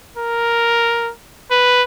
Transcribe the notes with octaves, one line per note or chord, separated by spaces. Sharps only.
A#4
B4